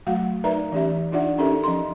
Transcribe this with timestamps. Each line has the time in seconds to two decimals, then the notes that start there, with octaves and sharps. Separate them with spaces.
0.07 F#3 A3 F#4 F5 F#5
0.44 D#4 A#4 B4 D5 E5 A#5
0.72 E3 C#4 G4 E5
1.12 D4 D#4 F4 D5 E5 F#5
1.38 C#4 D#4 G4 A4 A#4 E5
1.64 F3 C#4 C6